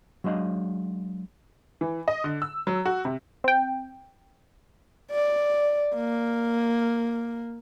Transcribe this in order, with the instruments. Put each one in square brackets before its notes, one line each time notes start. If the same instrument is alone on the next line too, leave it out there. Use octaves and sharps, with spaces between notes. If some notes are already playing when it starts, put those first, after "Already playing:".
[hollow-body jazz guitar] F#3 G#3 D4 D#5 F5
[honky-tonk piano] E3
D#5
D3
E6
F#3
F#4
C3
[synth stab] C4 G5
[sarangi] D5
A#3